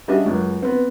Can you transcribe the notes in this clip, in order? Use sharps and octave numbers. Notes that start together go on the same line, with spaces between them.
G3 C#4 D4 F#4 D#5 E5
C#2 F#2
B3 C4